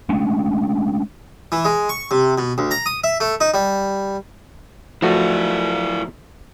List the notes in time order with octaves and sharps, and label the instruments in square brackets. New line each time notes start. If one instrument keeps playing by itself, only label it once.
[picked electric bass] G#3 A3 C#4 D4
[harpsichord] E3
G#3
C#6
C3
B2
D2
A#5
D#6
E5
A3
D#4
G3
[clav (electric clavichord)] F3 A3 F#4 [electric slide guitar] E4 A4 D5